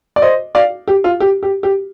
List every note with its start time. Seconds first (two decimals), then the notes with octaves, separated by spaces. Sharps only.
0.16 D5
0.22 C5 D#5
0.55 D5 F5
0.88 G4
1.04 F4
1.20 G4
1.43 G4
1.63 G4